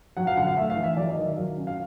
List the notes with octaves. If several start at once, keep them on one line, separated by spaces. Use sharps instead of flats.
F#3 F#5
F5
D3 F#5
F5
A3 E5
F5
E3
E5
F#3 D5
D#5
D#3
E5
F#3 F5
C#4
F5